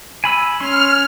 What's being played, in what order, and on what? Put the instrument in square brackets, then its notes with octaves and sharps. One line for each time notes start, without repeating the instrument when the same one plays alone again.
[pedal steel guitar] G#5 B5 E6
[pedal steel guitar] C#4 C6 [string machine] F6